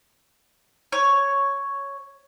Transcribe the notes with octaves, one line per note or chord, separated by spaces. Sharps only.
C#5